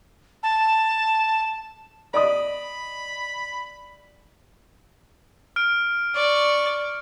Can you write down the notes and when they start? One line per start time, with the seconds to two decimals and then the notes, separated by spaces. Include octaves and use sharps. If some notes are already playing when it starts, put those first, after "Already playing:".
0.43 A5
2.14 D5 D#5 B5 D#6
5.56 F6 D7
6.15 D5 C#6